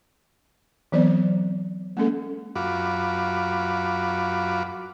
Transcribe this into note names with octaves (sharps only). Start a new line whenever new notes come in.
E3 F#3 B3 C4 C5 D5
G#3 A#3 C#4 A4
F#2 F4 F#4 B5 D6